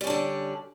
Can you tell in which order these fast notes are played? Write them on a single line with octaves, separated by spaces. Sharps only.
G3 C#4 D4 D3